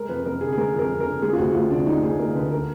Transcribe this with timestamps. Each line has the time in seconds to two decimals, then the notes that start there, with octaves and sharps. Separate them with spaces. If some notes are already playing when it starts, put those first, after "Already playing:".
Already playing: G#3 A#4
0.09 F2 B4
0.26 F2 A#4
0.41 D3 G#4
0.52 G#4
0.58 G#3 A#4
0.74 F2 A#4
0.90 F2
1.00 A#4
1.06 D3
1.22 G#3 G#4
1.33 F4
1.38 D2 F#4
1.54 D2 F4
1.70 D3 D4
1.87 G#3 D#4
2.02 D2 G#4
2.19 D2 A#4
2.35 D3 B4
2.51 A#4